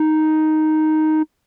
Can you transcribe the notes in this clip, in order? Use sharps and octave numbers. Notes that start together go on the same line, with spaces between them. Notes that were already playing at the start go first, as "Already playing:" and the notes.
Already playing: D#4